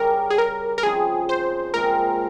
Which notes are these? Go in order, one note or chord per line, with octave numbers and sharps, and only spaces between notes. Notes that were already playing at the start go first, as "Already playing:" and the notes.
Already playing: C#3 G3 C#4 A#4
G#4
A#4
A#4
C#3 F3 C4 D#4 G#4
C5
A#2 G#3 C4 A#4